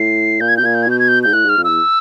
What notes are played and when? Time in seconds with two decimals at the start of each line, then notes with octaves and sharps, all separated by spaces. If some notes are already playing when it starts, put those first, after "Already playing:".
Already playing: A2 C7
0.40 A#2 G6
0.48 G#6
0.57 B2 G6
0.63 A#2 G#6
0.74 G6
0.83 G#6
0.87 B2 G6
0.99 G#6
1.08 G6
1.23 G#2 G6
1.33 A2 F#6
1.45 G#2 F6
1.57 F2
1.64 E2 E6